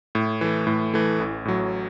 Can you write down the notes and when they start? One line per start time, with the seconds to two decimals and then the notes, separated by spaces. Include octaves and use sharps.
0.15 A2
0.41 E3 A3
0.67 A2
0.94 E3 A3
1.19 A1
1.45 A2 F#3